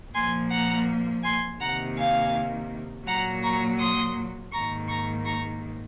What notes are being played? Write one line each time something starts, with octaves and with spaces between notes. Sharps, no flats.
A#2 F3 A#3 G#5 C6
F#5 A#5
G#5 C6
C3 D#3 A#3 F#5 A#5
F5 G#5
A#2 F#3 A#3 F#5 A#5
A#5 C#6
C6 D#6
G#2 D#3 A#3 A#5 C#6
A#5 C#6
A#5 C#6